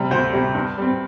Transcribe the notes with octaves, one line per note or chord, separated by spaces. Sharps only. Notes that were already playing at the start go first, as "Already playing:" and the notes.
Already playing: C3 G3
D2 C5
C3 G3
G2
G3 C4